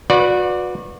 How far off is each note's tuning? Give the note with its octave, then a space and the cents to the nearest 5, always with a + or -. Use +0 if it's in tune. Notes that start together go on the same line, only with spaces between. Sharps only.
F#4 -35 B4 +0 D5 +0